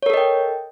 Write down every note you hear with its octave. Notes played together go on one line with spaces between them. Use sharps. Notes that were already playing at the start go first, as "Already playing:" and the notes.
A4 A#4 C#5 D#5 G5